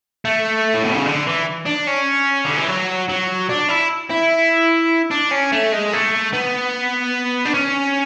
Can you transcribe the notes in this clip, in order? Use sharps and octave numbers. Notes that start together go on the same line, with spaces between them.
A3
A2
B2
C#3
D3
E3
D4
C#4
D3
E3
F#3
F#3
D4
E4
E4
D4
C#4
A3
G#3
A3
B3
D4
C#4